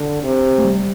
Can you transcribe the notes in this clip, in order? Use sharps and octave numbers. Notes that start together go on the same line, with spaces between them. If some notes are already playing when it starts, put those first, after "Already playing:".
Already playing: D3
C3
A3
G3